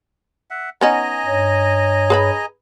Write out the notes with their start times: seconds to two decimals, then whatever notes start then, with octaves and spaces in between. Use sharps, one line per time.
0.51 E5 F#5
0.81 B3 C#4 D#4 D#5 G#5 A#5
1.26 G2 C#5
2.10 G#4 B4 B5